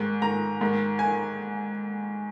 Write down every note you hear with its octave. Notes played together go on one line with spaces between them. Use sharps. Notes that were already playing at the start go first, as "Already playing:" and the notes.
Already playing: G#2 D#3
G#2 D#3 A#5
G#2 D#3
D#3 G#5